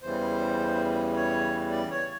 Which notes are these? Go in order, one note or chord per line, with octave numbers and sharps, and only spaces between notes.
E2 C#3 E3 G3 C5
C#5
D5
C#5